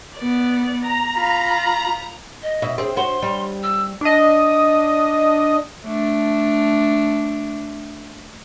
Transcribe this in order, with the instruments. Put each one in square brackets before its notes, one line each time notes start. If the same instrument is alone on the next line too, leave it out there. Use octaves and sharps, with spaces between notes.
[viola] B3 D5
[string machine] A#5
[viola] F4 B5
[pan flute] D#5
[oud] B2 E5
[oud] C4 [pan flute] G#4
[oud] F#4 C5 [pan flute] C6
[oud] G3
[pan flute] E6
[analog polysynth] D4 D#5
[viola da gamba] A3 D4